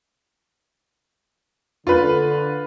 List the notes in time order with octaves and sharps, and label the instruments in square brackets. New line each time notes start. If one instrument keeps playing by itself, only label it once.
[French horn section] D3 [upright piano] F4 B4